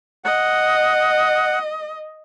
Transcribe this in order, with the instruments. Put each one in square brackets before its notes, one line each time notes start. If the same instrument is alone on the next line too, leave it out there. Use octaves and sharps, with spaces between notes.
[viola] D#5 [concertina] F#5